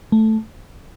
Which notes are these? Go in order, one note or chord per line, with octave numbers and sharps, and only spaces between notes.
A3